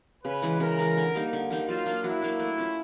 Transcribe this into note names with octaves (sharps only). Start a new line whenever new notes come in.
C#3 B4
E3 G#3
C#3 A#4
E3 G#3
D3
G3 A#3 D#4
D3
G3 A#3 D#4
F#3 F4
A#3 D4
F#3 E4
A#3 D4
A3
C#4 F4